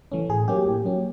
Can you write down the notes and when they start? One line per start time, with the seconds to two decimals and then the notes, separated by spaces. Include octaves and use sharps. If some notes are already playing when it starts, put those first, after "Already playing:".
0.12 E3 A3 C#4
0.29 A2 G#4
0.48 F#3 A#3 C#4 G4
0.66 A2
0.85 F#3 A#3 C#4